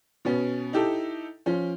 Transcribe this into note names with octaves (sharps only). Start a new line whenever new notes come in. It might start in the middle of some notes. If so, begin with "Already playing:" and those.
B2 B3 C#4
D#4 E4 G4 A4
F3 C#4